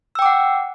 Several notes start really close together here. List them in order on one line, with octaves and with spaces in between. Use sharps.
E6 G5 D6 F#5